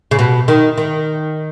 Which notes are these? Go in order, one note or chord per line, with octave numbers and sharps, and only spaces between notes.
C#3
B2
D#3
D#3